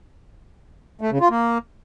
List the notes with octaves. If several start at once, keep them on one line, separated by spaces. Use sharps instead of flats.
A3
C#3
F4
A#3